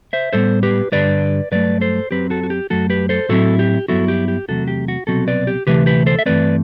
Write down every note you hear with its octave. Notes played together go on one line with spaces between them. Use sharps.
C5 E5
A2 G3 B3 A4 C5
G4 B4
G2 D3 G3 B4 D5
G2 F#3 A3 B4 D5
A4 C5
F#2 F#3 C4 G4 B4
F#4 A4
F#4
G4
F#2 F#3 A3 F#4 A4
G4 B4
A4 C5
A2 F#3 C4 E4 F#4 A4
G4
G2 F#3 B3 E4 F#4 A4
G4
G4
E2 C3 F#3 A3 F#4 A4
G4
F#4
C2 B2 F#3 C4 F#4 A4
B4 D5
G4
D2 C3 E3 A3 G4 B4
G4 B4
A4 C5
E5
G2 E3 A3 C4 B4 D5